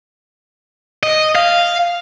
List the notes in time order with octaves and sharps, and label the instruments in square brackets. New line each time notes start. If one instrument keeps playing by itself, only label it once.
[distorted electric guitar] D#5
F5